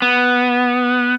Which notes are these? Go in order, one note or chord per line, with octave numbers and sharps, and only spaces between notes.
B3